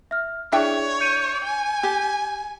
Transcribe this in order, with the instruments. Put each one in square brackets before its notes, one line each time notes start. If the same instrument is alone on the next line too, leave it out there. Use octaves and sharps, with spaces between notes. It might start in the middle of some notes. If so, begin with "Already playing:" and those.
[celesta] E5 F6
[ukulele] D4 E5 G5 [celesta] E4 G#4 [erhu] C#5
[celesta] G6 C#7 D#7
[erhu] G#5
[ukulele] G4